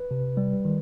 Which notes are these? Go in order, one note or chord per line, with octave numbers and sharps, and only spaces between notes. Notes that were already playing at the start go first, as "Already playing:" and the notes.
Already playing: B4
C3
G3
D#3